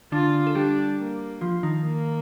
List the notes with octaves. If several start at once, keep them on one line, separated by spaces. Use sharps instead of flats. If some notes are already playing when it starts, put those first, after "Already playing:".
D3 D4 F4
A4
G3 D4 G4
A#3
F3 F4
D#3 D#4
A#3